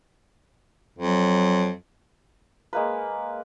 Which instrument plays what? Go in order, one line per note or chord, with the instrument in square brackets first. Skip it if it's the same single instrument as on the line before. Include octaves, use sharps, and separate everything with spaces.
[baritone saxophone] F2 [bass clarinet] F#3
[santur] G#3 A#3 B4